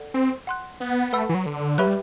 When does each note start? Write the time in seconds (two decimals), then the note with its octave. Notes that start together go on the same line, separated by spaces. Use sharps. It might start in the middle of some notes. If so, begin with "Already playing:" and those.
Already playing: A4 D5 F#5
0.14 C4
0.47 F#5 C6 F#6
0.80 B3
1.13 A3 B4 F#5 B5 E6
1.29 E3
1.34 F#3
1.46 D3
1.78 F#3 G4 B4 E5 B5 F#6
1.87 G3